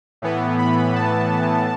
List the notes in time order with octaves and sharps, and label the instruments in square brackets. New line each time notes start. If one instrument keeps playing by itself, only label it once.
[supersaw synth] A2 E3 B3
B5
A5